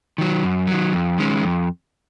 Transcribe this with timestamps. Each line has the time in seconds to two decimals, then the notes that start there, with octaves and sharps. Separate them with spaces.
0.18 D#3 F#3
0.43 F#2
0.67 D#3 F#3
0.93 F2
1.18 D#3 G#3 C#4
1.43 F2